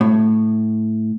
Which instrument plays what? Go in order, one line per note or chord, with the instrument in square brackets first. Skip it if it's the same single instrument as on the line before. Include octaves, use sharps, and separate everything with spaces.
[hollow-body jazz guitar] A2